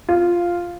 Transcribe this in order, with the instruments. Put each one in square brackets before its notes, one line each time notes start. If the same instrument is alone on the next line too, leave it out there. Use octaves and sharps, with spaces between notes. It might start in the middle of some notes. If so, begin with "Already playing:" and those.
[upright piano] F4